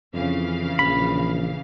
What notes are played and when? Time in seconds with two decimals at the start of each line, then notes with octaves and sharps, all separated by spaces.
0.14 F2 C#3 E3 F5
0.79 A#1 B5